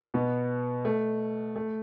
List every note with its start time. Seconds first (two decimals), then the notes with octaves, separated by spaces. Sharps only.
0.14 B2 B3
0.85 A3
1.56 A3